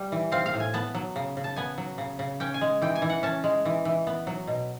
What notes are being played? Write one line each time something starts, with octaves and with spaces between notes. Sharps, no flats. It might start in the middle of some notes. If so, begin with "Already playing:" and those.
Already playing: G3
E3
C4 F5
F5
A2
G#5
B3 A5
F#3
C#3
C#3
A5
B3 G#5
F#3
C#3
C#3
C#4 G5
G#5
G#3
E3 G5
G#5
E3
F#5
C#4 A5
G#3
E3
E3
B3
F#3
B2